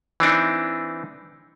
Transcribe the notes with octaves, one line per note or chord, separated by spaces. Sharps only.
E3 C4 D4 D#4